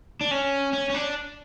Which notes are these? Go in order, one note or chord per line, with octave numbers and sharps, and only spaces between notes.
D4
C#4
C#4
C#4
D4